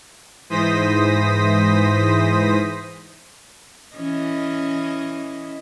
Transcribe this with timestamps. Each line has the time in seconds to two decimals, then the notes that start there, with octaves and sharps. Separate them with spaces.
0.49 G#2 E3 C5 D#6 A#6 B6
3.96 E3 C#4 D#5